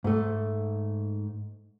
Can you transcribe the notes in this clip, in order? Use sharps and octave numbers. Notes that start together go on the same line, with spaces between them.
G#2 A3